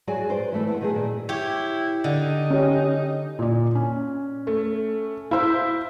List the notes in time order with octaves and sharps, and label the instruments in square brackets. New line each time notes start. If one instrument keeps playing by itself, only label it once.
[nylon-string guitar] F#3 F#4 G#4 D5 G#5
B4 C5 D5
E3 A3 B4
A3 B3
D#3 F#3 G#4
A#2
[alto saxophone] E4 [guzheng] G4 C#5
[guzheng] D3 [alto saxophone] D#4
[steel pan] C#4 G4
[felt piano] A#2 D5
C#4
[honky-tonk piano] A3
[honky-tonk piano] E4 C5 [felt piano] F5 E6